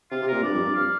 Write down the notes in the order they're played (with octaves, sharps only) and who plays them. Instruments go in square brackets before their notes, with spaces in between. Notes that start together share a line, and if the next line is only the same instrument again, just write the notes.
[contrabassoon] C3 [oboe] F4
[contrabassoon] C3
[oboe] A#4
[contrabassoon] A#2
[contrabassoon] G2 [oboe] D5
[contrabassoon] F2
G2
[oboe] F5